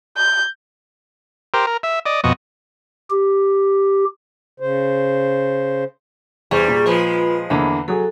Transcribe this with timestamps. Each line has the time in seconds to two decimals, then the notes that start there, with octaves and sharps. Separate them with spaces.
0.17 G6
1.54 G4 A#4 C5
1.67 A#4
1.83 E5
2.06 D5 D#5
2.24 F2 B2 F#4 D#5
3.10 G4
4.60 C#3 C5
6.51 E2 G3 G#4 C5 C#6
6.68 A#2
6.86 F3 G#3 F4 B4 B5
7.50 E2 D3 A#3 B5
7.88 F#3 G#4 A4